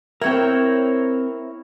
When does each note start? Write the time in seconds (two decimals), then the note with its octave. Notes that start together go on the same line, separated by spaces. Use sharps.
0.21 C4 E4 A#4 C#5 G5